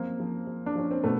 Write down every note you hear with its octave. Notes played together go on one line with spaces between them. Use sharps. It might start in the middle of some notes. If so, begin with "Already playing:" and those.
Already playing: F#2 F3 A#3 C4
F3
F3
D4
F3 C#4
C4
B2 A3 B3